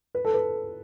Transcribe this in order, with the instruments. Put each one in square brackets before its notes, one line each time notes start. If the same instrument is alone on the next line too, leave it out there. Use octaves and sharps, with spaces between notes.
[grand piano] B4
A4
B4